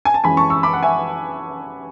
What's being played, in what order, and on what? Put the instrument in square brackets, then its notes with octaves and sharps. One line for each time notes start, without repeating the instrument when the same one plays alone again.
[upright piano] G#5
A5
F#2 E3 G#3 C#4 G#5 B5
A5 C#6
C#6 E6
B5 D6
F#5
E5 G#5